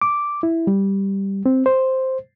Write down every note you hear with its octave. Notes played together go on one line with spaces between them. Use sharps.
D6
E4
G3
C4
C5